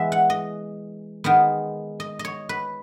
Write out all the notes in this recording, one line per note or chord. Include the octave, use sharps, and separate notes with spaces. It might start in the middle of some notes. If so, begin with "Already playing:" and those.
Already playing: E3 G#3 B3 G#4 E5
F#5
D#5
D#3 G#3 B3
D#5
D#5
C#5
B4